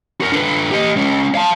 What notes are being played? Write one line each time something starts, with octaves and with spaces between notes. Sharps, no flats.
F#4 A#4
D3 B4
G4 D#5
G#3 C#4
F5 A5